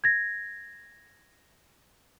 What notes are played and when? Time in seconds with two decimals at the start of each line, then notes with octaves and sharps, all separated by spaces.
0.04 G#6 A#6